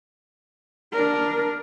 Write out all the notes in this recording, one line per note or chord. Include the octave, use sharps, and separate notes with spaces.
D4 A#4